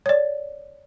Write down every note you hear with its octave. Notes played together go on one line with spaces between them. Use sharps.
C#5 D5